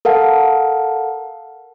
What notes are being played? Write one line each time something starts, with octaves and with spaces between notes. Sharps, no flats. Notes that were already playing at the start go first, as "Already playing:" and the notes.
A4 A#4 F5 F#5 A5